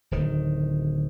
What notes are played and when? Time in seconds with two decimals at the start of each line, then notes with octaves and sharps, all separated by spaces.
0.11 D1 D#3